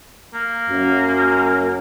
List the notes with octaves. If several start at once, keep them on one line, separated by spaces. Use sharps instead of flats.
A#3
F#2